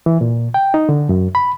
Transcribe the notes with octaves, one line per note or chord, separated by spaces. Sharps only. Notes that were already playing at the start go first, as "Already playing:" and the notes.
E3
A#2
G5
D#4
D3
F#2
B5